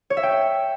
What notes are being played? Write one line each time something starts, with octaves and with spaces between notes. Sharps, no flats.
C#5
E5
G5